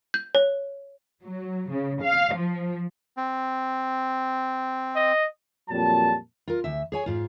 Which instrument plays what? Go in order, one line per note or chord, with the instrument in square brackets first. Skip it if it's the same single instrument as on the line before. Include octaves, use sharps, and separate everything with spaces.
[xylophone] G6
C#5
[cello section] F#3
C#3
F5
F3
[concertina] C4
[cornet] D#5
[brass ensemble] F2 A#2 F#3 G3 A5
[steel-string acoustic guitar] F4 A#4
D2 E5
G#4 C#5 G#5
G#2 F4